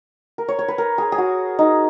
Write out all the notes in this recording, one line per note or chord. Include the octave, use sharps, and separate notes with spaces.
A#4
C#5
C#5
B4
A#4
G#4
G#4
F#4
D#4